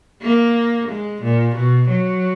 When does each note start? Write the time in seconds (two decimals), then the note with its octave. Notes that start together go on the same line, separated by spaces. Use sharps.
0.22 A#3
0.88 G#3
1.22 A#2
1.56 B2
1.88 F#3